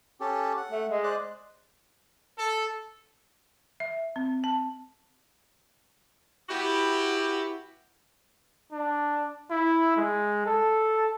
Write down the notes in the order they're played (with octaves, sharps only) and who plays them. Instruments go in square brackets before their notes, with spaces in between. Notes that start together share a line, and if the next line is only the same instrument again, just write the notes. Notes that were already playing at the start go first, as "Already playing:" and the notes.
[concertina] C#4 G4 A4
F#5
[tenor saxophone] A3
G#3
[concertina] C5 D5 F#6
[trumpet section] A4
[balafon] E5
C4
A5
[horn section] B3 E4 F#4 G4
[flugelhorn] D4
E4
G#3
A4